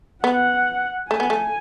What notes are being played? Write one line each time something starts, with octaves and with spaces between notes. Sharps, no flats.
B3 F#5
A3 G#5
B3
A3